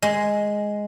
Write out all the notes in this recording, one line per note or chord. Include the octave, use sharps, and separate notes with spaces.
G#3